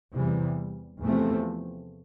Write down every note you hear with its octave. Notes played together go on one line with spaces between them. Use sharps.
E2 C3 E3 G3
E2 C3 F3 A3 C4